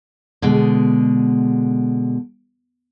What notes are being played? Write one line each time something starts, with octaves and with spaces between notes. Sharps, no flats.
B2 D3 G#3